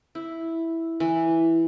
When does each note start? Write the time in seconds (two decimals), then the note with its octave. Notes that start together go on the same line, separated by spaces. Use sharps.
0.15 E4
1.00 E3